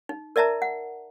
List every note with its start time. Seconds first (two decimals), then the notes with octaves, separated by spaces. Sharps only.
0.09 D#4
0.36 A#4 D5 E5 A5 A#5
0.62 F#5